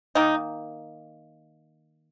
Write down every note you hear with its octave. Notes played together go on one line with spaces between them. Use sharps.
D#3 A#3 D#4